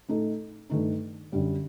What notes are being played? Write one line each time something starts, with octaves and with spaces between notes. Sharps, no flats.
A2 A3 D#4 A4
G2 D#3 A3 D#4
F#2 D3 G3